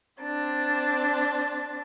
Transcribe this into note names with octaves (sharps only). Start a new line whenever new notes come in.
C4 D4 A6